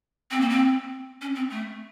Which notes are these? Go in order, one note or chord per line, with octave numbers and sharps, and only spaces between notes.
C4
A#3
C4
C#4
C4
A3